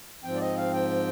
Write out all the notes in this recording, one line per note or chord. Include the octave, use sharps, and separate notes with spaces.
G#2 F3 C4 G5
D5
D#5
F5
G5